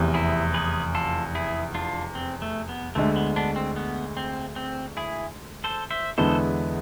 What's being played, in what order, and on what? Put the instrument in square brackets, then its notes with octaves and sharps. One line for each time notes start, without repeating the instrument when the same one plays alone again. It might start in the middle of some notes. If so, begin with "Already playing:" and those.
Already playing: [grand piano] F1 E2 C3
[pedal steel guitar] E4 G#4
G#4 B4
F4 A4
E4 G#4
D4 F4
C4
A3
B3
[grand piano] D2 D3 G#3 [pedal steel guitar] A3
[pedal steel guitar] B3
B3 D4
C4
B3
C4
C4
E4 G#4
A4 C5
C5 E5
[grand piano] E2 D3 G#3 B3 E4 [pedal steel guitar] A4 C5